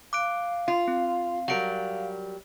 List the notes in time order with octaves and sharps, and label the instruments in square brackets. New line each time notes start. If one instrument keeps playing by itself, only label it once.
[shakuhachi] F5 [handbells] D6 F#6 D7
[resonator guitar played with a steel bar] F4
[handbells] C4
[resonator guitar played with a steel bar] F#3 G3 A#4 [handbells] F#5 D7